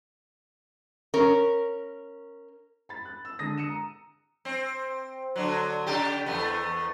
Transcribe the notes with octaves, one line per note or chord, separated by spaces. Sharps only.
C#4 A#4
B5 A6
F#6
E6
D3 G#3 D#6 A#6
D#6 C#7 D#7 E7
A#5
C4
D3 F#3
C#3 G4
E2 A3 B3